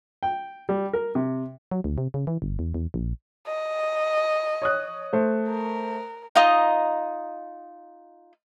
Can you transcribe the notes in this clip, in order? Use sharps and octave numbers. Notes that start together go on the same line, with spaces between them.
G5
G3
A#4
C3
F#3
D2
C3
C#3
E3
G1
E2
E2
A#1
D#5
C#5 D#6 F#6
A3 C5
A#4
D#4 F4 D#5 A#5